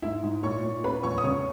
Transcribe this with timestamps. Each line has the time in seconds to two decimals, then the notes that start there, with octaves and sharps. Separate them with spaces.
0.02 G#2 E4 E5
0.23 G#2
0.43 A#2 C#5 C#6
0.63 A#2
0.84 C#4 B4 B5
1.03 E2 C#5 C#6
1.18 D#6
1.24 C#3 C#5 C#6